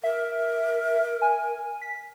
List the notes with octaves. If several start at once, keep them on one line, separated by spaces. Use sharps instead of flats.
A#4 E5
G#5
B6